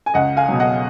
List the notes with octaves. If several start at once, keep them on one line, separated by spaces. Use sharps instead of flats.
G#5
C#2 D#5 F#5
F5 G#5
B2 F#3
D#5 F#5